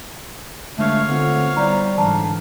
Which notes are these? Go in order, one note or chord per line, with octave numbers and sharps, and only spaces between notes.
D3 G#3 A3 D4 C#5 F5
D3 B3 C4 F4
G3 E4 C5 A#5
G#2 D3 E3 A5 A#5